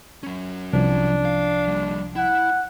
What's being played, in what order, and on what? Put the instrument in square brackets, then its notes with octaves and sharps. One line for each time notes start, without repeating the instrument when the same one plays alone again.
[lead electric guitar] F#3 C#4
[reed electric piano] C2 F3 [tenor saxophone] D4
[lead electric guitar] F5
G3 A#3
[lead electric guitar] E4 [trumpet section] F#5